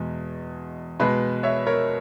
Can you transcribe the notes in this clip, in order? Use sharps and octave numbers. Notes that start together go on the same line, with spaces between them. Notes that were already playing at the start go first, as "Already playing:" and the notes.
Already playing: E2 B2 G#3
B2 G#3 B4
C#5 E5
A#4 C#5